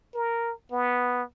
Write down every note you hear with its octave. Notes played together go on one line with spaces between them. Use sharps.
A#4
B3